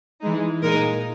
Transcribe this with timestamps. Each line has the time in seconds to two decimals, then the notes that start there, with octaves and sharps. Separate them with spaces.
0.21 E3 G#3 D#4
0.62 A#2 G#3 D#4 A#4